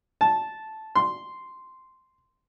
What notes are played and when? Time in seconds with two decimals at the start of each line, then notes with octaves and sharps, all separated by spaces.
0.21 A5
0.95 C6